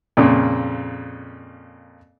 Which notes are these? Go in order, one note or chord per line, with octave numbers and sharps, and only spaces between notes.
F2 A#2 C#3